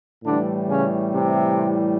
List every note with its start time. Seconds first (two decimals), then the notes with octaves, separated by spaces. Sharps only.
0.24 A2 D3 E3 G3 D4
0.69 C#3 C#4
1.13 C3 C4